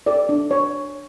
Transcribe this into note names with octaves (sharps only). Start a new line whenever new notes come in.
A4 D5
D4
C#5